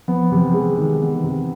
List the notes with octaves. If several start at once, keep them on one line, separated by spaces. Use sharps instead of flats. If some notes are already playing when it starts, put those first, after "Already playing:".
F3 B3
C3 F3
E3
G#3
D#3
B3
C3